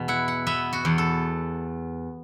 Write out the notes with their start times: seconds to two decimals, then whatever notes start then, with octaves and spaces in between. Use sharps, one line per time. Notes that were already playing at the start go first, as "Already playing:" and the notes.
Already playing: E2 B2
0.08 E4 F#5
0.28 F#5
0.47 B3 E5
0.73 F#4
0.85 E2
0.98 A4